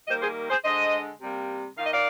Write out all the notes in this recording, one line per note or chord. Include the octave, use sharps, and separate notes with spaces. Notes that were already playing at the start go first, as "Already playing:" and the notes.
D#3 G3 A#3 C5 D#5
G#4 C5
G#4 C5
D3 G#3 C5 D#5
C3 G3 A#3
D#3 A#3 F5
D#5
D5 F5